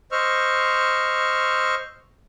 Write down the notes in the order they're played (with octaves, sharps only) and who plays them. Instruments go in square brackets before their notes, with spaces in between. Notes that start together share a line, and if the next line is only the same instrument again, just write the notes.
[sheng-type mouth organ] C5 D#5 C#6 E6 F6